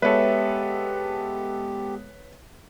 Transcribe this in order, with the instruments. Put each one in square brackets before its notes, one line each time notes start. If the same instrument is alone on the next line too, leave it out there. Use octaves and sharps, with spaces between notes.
[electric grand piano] G#3 B3 A4 [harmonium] G4 [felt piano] B4 C#5 [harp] E5